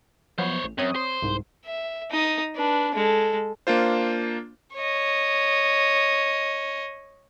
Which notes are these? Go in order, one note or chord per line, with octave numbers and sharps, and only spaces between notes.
F3 F#3 B3 C5 C#5
A1
F#2 C4 C#5 D#6
C5
C2 G#2
E5
D#4 D#6
D4 B4
G#3 A4
A#3 D4 F4 C5
C#5 D#5